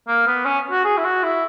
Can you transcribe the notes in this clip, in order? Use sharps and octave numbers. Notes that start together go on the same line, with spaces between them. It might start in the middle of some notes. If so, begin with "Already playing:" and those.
A#3
B3
C#4
F#4
G#4
E4
F#4
E4